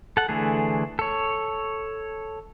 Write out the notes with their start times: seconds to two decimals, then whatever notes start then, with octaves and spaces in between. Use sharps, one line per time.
0.17 A4 F#5
0.29 D3 E3 A3 G#4
0.99 A4 C#5